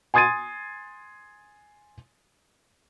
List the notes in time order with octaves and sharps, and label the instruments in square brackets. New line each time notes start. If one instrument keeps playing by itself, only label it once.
[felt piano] G#5 C6 D#6 G#6 A6 D#7